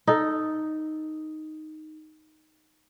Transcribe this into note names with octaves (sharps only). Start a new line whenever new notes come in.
D#4 A4